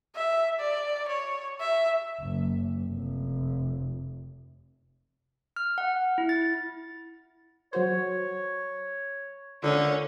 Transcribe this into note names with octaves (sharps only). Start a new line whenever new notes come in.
E5
D5
C#5
E5
F#1
F1
F6
F#5
E4
A6
F#3 F#4 C5 C#5
D3 C#4 F4 A#4